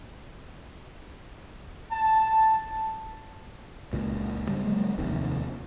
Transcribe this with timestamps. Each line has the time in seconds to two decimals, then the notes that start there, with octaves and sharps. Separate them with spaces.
1.92 A5
3.93 C#2 A#2
4.49 G2 C#3 G3
4.64 C#3 F#3 G#3 A#3
4.98 F1 D#2 C3 D#3